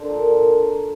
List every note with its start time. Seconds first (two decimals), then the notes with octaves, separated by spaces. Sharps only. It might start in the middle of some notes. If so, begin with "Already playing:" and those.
Already playing: D3 C5
0.08 A#2 A#4
0.24 A#2